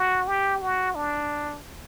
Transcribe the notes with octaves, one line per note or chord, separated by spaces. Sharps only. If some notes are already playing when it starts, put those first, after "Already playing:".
Already playing: F#4
G4
F#4
D4